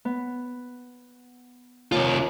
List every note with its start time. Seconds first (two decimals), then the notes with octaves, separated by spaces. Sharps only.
0.05 B3
1.92 D#2 C3 F4